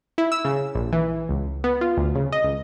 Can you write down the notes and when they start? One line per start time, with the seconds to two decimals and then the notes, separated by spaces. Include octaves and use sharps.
0.18 E4
0.32 E6
0.45 C#3
0.75 A#1
0.93 E3
1.29 C#2
1.64 B3
1.81 F4
1.97 D2
2.15 C#3
2.32 D#5
2.44 C#2